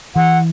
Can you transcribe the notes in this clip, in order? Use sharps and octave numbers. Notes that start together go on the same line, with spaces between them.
E3 F#5